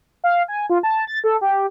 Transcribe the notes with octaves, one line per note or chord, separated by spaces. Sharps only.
F5
G#5
F4
A5
A6
A4
G4